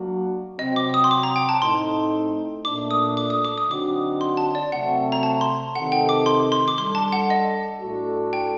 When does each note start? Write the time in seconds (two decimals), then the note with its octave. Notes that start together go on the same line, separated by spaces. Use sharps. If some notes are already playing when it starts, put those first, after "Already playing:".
Already playing: F#3 A#3 D4 F#4
0.59 C3 F#3 C4 D#5
0.76 D6
0.94 D#6
1.04 C6
1.11 D6
1.23 A#5
1.36 G5
1.49 A5
1.62 A2 A3 C4 D#4 C6
2.65 A#2 A3 D4 D6
2.91 D#6
3.17 D6
3.30 D#6
3.45 D6
3.58 D#6
3.69 D3 F#3 C4 D#4 F#4 D6
4.21 C6
4.37 A5
4.55 D5
4.72 C3 F#3 A3 C4 F#5
5.12 A#5
5.23 A5
5.41 C6
5.75 C3 D#3 A3 D#4 A4 F#5
5.92 G5
6.09 D6
6.26 C6
6.52 C6
6.68 D6
6.78 G3 D4 A4 C6
6.95 A5
7.12 F#5
7.30 D#5
7.81 A2 A3 D4 F#4 A4
8.33 G5